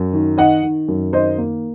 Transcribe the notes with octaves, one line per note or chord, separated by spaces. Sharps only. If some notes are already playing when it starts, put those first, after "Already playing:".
Already playing: F#2
D#3
D#3 D#5 F#5
D#3
F#2
D#3 C5 D#5
A#3